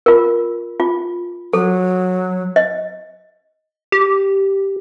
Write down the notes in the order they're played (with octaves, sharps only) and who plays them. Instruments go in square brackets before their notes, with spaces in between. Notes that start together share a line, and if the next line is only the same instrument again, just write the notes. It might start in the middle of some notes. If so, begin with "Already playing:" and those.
[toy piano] F4 A#4
F4
[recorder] F#3 [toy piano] A4
[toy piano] D#5
[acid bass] G4